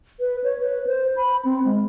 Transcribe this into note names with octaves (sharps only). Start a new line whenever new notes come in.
B4
C#5
B4
C5
B5
C4
G#3